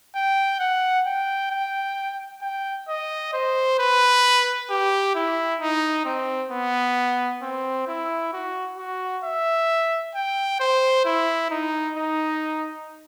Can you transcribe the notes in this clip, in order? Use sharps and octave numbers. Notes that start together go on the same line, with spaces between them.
G5
F#5
G5
G5
G5
D#5
C5
B4
G4
E4
D#4
C4
B3
C4
E4
F#4
F#4
E5
G5
C5
E4
D#4
D#4